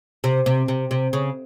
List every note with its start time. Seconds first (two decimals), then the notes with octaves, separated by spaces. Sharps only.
0.24 C3
0.46 C3
0.68 C3
0.91 C3
1.13 C#3